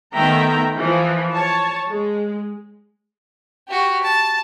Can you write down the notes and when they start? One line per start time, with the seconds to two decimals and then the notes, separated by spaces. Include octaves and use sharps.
0.14 D#3 A3 B3 E5 G5 A#5
0.77 E3 F3
1.32 C#5 A5
1.88 G#3
3.68 F#4 G4
4.03 A5